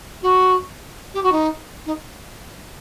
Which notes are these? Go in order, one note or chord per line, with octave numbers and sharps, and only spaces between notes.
F#4
G4
F#4
D#4
D#4